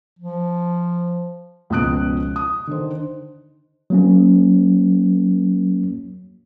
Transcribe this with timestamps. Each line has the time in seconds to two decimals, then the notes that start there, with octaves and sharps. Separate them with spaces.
0.19 F3
1.70 C#2 B2 F3 D#6 F#6 D7
2.36 D#6
2.67 D3 D#3 C5
3.90 F#3 A#3 C#4